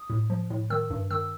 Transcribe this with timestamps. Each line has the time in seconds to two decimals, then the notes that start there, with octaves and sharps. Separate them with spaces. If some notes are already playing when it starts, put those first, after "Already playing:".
Already playing: D#6
0.10 A2
0.30 F3
0.50 A2
0.70 D#3 E6
0.90 G2
1.11 D#3 E6